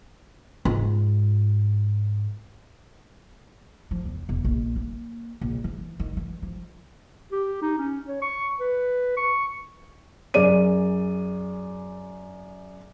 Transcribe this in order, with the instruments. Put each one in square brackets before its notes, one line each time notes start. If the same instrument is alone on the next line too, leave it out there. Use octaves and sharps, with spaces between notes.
[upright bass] G#2 F4
F3
E2
E1
A#1
A#3
A#1
E3
D#3
E3
F3
[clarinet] G4
D#4
C#4
C#5
C#6
B4
C#6
[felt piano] F#2 G#4 D5 D#7